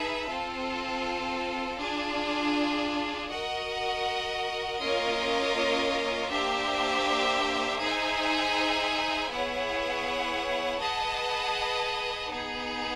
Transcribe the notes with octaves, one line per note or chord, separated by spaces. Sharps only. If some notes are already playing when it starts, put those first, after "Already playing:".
Already playing: D#4 G#4 B4 E5 A5
C4 F4 A4
D4 F4 G#4
F#4 A#4 D#5 F#5
A#3 C#4 F4 A#4 D#5
A#3 D4 G4 C5 E5
D#4 G#4 C5 E5 G#5
B3 E4 G#4 C#5 F#5
G#4 B4 D#5 F#5 A5
B3 D#4 G#4